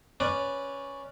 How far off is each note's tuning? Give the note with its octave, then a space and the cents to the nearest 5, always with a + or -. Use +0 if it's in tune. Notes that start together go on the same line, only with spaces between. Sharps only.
C#4 +0 B4 +0 D5 +0